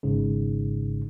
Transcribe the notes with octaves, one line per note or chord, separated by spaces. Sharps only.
G#1 G#2 C#3